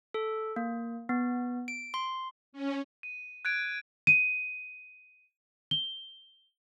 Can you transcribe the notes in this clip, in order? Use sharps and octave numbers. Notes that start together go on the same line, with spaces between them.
A4
A#3
B3
D7
C6
C#4
D#7
F#6 G#6 D7
D#7
G7